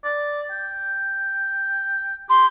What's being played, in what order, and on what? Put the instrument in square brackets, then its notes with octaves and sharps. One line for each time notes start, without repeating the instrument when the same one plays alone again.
[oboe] D5
G5
[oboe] G4 [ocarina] C6